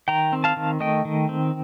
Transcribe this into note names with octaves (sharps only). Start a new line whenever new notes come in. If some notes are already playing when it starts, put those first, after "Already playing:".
D#3 G5 A#5
C4
F5 A5
D#3
A3 D#5 G5
D#3
C4